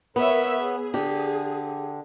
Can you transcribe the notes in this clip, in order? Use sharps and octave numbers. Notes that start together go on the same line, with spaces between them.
B3 A#4 C#5 E5
G#4
D3 G4